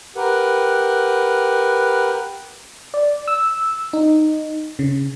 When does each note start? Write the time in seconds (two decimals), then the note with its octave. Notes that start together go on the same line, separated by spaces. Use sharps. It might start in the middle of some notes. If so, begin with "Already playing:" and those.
0.16 G4 A#4 B4 F#5
2.94 D5
3.28 E6
3.93 D#4
4.79 C#3